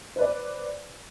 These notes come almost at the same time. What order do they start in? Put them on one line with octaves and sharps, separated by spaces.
C5 B4 D5